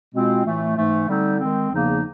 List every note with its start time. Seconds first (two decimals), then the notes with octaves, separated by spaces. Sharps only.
0.13 B2 G#3 C4 F4
0.45 A2 E3 A3
0.76 G#2 E3 A3
1.08 D3 G3 C4 D#4
1.39 D#3 G#3 C4
1.70 E2 C#3 F3 A#3 D#4